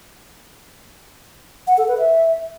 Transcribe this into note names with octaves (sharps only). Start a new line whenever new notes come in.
F#5
A4
B4
E5